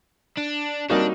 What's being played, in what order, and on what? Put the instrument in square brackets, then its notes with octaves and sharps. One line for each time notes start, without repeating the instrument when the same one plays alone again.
[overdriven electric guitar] D4
[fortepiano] G3 A#3 D#4 F#4 [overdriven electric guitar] D4